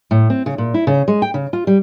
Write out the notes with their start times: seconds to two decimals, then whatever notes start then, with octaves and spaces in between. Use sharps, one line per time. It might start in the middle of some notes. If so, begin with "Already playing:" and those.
0.11 A2
0.30 C4
0.46 C#3
0.58 A#2
0.74 E4
0.87 C#3
1.08 G#3
1.22 G5
1.34 C#3
1.53 F4
1.67 G3